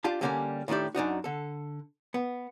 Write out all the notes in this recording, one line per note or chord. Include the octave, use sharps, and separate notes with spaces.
D4 F4 G4 A5
D3 G3 A#3 C#4 G4 G#5
A2 D#3 A3 D4 G4
F#2 D4 D#4 F#4
D3 A4
B3